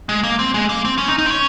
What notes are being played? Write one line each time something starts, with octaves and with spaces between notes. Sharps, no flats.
G#3
A#3
C4
G#3
A#3
C4
C#4
D#4
D#4
C4
C#4